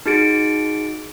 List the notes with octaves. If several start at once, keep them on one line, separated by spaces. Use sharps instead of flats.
D#4 F#4 G#4 A6 C#7 D7